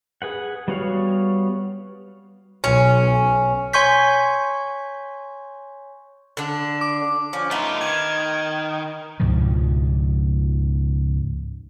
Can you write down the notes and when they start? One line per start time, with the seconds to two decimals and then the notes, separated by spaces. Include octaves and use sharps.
0.22 G#4 B4 F#5
0.68 G3 B3 F#4 C#5 F5
2.64 B1 C#4
3.73 C#5 G#5 C6 C#6 G6 B6
6.37 D3 D4
6.81 D6
7.33 F3 C#4
7.51 A3 B3 D#4 F4
7.81 D#3 G#6
9.20 C#2 G#2 B2 F3